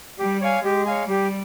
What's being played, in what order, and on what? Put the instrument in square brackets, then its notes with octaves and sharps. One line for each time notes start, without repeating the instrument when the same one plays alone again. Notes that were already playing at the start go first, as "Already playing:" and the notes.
[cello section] G3 [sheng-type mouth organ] G4
[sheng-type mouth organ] C#5 F5 G#5
[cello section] G#3 [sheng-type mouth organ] G4
[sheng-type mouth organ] C#5 F5 G#5
[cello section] G3 [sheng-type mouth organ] G4